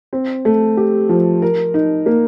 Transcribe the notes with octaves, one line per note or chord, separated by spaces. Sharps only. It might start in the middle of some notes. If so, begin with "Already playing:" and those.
C4
A3
G4
F3
A#4
D#4
A#3